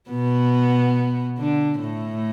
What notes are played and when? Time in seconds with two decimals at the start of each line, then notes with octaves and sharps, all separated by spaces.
0.10 B2 B3
1.38 D3 D4
1.81 A2 A3